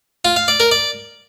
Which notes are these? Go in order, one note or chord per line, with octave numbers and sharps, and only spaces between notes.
F4
F5
D5
A#4
D5